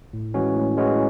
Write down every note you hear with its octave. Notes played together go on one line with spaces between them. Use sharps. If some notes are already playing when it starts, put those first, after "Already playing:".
A2
E3 G#3 C#4 F#4
A2
E3 G#3 C#4 F#4